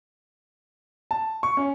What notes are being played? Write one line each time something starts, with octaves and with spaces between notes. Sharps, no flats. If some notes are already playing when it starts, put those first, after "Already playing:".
A5
C#6
C#4